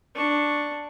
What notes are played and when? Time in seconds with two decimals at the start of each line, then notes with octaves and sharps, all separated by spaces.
0.15 D4 C#6